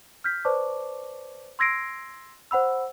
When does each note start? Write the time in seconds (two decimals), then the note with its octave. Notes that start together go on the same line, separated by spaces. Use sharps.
0.24 F6 G6 B6
0.45 B4 C5 D5 A5 C#6 D6
1.59 C6 E6 G#6 A#6 C7 D7
2.51 C5 F#5 B5 E6